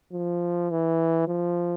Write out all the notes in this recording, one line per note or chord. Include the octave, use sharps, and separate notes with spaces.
F3
E3
F3